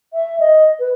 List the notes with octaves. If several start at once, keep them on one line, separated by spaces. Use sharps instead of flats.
E5
D#5
B4